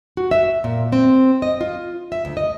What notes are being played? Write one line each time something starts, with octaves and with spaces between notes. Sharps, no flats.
F#4
E5
A#2
C4
D#5
F4
E5
D2
D#5